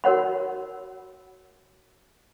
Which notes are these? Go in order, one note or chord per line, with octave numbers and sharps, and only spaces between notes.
F#4 A#4 C#5 F#5 B5